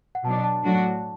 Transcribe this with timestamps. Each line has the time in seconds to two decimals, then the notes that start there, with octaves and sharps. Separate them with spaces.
0.15 F#5
0.24 B2 F#3 D4 A5
0.44 A5
0.64 A2 F#3 D4 F#4